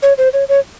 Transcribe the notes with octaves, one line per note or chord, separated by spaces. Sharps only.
C#5
C5
C#5
C#5